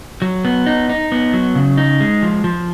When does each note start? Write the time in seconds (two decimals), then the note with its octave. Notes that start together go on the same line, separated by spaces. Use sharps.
0.22 F#3
0.45 B3
0.66 D#4
0.90 D#4
1.12 B3
1.34 F#3
1.55 C#3
1.78 D#4
2.00 G#3
2.23 F3
2.44 F3